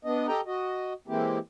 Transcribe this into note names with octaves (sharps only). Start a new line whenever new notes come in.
B3 D4 D#5
G4 A4 D#5 G5 A#5
F#4 D#5
E3 G#3 A#3 C4 E4 G4